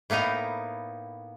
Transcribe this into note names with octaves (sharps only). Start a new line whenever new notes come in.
A2 A#3 B3 D#4 A#5